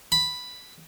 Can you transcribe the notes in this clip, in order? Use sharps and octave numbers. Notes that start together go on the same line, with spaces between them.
B5